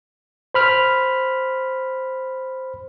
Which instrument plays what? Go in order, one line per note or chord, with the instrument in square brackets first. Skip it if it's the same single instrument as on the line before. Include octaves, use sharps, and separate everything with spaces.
[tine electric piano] C5 B5 F6